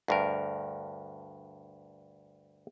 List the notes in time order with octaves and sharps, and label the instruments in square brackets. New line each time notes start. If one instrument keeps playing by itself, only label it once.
[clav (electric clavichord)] D2 G2 A#4